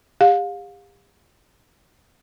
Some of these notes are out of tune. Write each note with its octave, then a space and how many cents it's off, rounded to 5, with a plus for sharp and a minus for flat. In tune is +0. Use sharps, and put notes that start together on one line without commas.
G4 +40 F5 +30